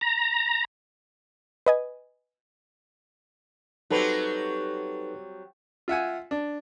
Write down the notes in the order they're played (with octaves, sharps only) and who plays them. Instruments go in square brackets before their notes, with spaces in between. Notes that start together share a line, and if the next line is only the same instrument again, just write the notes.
[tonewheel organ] A#5
[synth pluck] B4 D#5 G#5
[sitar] F#3 G3 C4 [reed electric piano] D#4 A4 B4
[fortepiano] F4 E5 F#5 G#5
D4